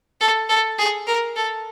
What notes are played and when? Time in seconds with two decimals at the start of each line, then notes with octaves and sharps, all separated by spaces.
0.21 A4
0.49 A4
0.78 G#4
1.07 A#4
1.37 A4